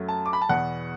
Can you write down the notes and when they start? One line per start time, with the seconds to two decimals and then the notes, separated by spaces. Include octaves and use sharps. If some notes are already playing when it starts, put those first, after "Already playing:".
Already playing: F#2 F#3 A3
0.09 A5
0.26 D6
0.33 B5
0.42 A5
0.49 E2 B2 B3 F#5